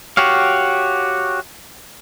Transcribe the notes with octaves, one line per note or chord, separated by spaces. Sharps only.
F#4 G4 C#5 F5